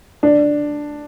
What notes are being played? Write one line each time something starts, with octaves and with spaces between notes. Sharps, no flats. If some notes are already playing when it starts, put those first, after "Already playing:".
D4